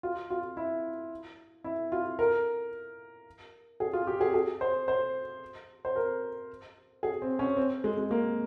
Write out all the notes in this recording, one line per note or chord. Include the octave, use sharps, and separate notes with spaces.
F4
F4
E4
E4
F4
A#4
G#4
F4
G4
G#4
G#4
C5
C5
C5
A#4
G#4
C4
C#4
C4
G#3
G#3
A#3